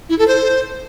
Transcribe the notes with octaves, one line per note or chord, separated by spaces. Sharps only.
E4
A4
C5